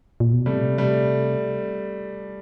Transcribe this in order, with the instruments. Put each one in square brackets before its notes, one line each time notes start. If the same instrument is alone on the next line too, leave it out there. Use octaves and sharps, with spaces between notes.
[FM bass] A#2
B2
[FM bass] C3 [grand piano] G3 A3
[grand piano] G3 A3